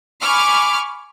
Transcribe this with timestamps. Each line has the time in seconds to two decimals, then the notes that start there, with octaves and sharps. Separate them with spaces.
0.21 G#5 B5 C#6 D6 F6